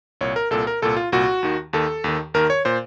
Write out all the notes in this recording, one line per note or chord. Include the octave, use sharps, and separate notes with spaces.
C2 A#2 C#5
A#4
C2 A#2 A4
A#4
C2 A#2 A4
F4
C2 A#2 F#4
D#2 D#3
D#2 D#3 A4
D#2 D#3
D#2 D#3 A#4
C#5
A#2 C5